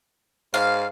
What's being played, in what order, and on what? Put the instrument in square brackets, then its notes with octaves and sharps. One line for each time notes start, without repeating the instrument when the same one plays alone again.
[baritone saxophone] G#2 [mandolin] F5